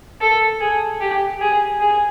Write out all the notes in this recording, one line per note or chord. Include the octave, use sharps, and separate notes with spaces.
A4
G#4
G4
G#4
G#4